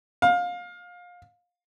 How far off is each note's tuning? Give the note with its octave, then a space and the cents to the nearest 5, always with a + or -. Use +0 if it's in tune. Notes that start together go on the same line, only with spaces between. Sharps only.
F5 +25